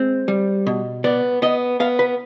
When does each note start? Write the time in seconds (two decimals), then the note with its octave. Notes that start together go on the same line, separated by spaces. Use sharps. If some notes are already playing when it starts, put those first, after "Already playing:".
Already playing: G#3 C4
0.28 G3
0.67 B2
1.04 B3 D5
1.42 B3 D#5
1.80 B3 F5
1.99 B4